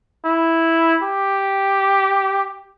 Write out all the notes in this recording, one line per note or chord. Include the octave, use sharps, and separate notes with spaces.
E4
G4